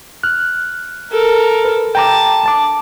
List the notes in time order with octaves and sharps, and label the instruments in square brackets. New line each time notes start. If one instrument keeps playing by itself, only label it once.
[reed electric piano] F6 F#6
[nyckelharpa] A4 A#4
[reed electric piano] B4
[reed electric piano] G5 A#5 D6 [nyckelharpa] A5
[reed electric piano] A5 D6